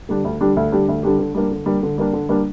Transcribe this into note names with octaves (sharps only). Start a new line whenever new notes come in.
D3 G3 D4 G4
D2
D3 G3 D4 G4
D2
D3 G3 D4 G4
D2
D3 G3 D4 G4
D3
G3 A#3 D4
D3
G3 A#3 D4
D3
G3 A#3 D4
D3
G3 A#3 D4